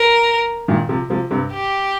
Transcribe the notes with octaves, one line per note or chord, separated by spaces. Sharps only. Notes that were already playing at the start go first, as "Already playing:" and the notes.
Already playing: A#4
A#2 D#3
C3 F3
C3 F3
G2 C3
G4